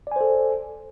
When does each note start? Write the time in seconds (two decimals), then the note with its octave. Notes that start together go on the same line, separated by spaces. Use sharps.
0.07 D5
0.12 G#5
0.16 C5
0.21 A4